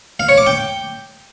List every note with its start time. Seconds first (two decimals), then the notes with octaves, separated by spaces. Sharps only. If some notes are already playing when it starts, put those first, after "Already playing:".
0.20 F5
0.29 C#5
0.38 D6
0.47 G5